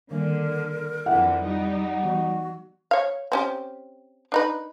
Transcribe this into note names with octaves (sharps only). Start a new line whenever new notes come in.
D3 D#3 G3 A#3 A#4
F2 D3 E3 E4 E5 F#5 G5
G3 D#4
E3 B3 F#4
C#5 F5
C4 C#4 G4
D4 D#4 B4